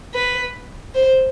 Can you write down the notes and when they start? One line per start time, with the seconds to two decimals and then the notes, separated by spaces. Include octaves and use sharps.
0.14 B4
0.94 C5